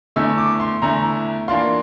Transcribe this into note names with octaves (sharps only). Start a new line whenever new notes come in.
E2 D3 A3 E4 E6
D6
C6
E2 D3 A3 E4 A#5
E3 A#3 D4 F4 C6